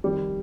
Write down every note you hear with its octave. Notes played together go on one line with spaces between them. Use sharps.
F2 D#3 G3